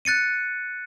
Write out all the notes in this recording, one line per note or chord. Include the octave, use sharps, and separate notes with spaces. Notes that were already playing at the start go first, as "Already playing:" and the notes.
F#6 A6 C#7 D#7